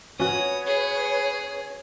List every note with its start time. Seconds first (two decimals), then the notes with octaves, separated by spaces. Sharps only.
0.20 C#4 F#4 B4 C#5 D#6
0.67 G#4